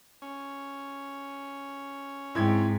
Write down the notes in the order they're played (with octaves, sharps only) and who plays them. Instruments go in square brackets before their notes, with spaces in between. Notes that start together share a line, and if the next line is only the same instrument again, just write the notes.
[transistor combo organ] C#4
[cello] G#2 [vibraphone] C4 G5 [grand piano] E4 G#6